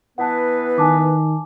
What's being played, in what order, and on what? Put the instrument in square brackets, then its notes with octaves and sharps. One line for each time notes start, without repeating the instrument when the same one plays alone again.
[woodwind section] E3 B3 B4 [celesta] F#5 A5
[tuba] D#3 [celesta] G#5 A5 D6